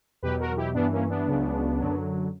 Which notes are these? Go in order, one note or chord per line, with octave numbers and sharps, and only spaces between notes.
E2 B2 F#3 G4 B4
F#4 A#4
E4 G4
G2 E3 B3 D4
A#3 C#4
B3 D4
C#2 C#3 F#3
F#2 D3 F#3